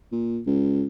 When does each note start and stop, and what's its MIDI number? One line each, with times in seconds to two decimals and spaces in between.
0.12 0.39 46
0.47 0.86 37